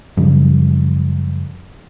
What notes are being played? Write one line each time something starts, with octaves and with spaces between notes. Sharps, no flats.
F#2 C#3 F3 G3